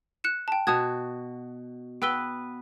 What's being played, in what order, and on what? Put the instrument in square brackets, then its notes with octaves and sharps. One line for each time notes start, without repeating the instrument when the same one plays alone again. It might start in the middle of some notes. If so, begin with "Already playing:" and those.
[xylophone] F#6 C#7 E7
G5 A5
[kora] B2 F#4 [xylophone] A5 D#6 G#6
[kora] B3 B4 [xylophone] G5 E6 G7